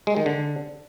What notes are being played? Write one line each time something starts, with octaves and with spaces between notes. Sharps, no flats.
G#3
D#3
D3